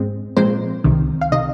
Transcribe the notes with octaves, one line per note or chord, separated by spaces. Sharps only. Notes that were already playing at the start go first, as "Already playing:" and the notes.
Already playing: G#2 G#3 C4
A#2 F3 G#3 C4 C5
C2 C3 D#3
F5
C3 D#3 D#5